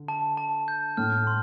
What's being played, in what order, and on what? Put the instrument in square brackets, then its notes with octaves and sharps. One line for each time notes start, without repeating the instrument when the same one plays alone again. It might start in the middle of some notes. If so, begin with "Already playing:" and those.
Already playing: [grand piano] D3
[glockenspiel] A5
A5
G6
[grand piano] A2 [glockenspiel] F6
[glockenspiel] C6